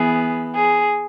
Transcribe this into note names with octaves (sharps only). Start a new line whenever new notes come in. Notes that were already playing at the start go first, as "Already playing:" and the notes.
Already playing: E3 B3 G#4
G#4